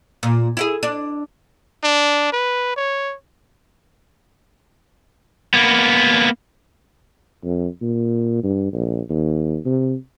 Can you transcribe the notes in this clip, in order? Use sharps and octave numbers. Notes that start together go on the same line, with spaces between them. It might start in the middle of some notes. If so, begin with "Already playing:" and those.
A#2
E4 F4 G#4
D4
D4
B4
C#5
A#3 B3
F2
A#2
G2
A#1
D#2
C3